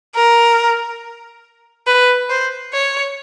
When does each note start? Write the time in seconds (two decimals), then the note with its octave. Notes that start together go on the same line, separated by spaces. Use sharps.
0.15 A#4
1.87 B4
2.30 C5
2.73 C#5